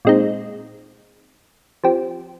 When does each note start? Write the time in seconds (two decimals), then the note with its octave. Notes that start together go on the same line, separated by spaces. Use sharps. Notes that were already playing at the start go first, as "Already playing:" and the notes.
0.05 A#2 G#3 C4 D#4
1.83 F3 C4 G4